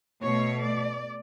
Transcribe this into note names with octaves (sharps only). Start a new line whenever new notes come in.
B2 A3 C#5
D5